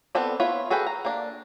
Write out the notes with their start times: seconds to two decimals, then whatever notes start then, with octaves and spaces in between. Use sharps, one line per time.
0.15 B3 C4 A4 D5
0.40 B3 E4 F4 C#5
0.70 F#4 G#4 A4 B4 G5
0.86 A#5
1.05 A#3 D4